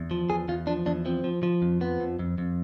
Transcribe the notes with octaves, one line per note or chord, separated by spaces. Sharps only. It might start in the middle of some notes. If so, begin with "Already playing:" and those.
Already playing: E2
F3
E2 G#4
E2 F4
F3 D4
E2 D4
F3 C4
F3
F3
F2
F3 B3
F2
F2
F2